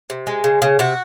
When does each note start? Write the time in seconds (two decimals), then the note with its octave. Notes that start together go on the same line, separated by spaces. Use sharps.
0.10 C3
0.27 G#3
0.44 C#3
0.62 C#3
0.79 C3 F#4